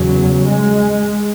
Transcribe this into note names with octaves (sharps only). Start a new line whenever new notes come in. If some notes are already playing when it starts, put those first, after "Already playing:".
Already playing: E2 C#3 F#3
G#3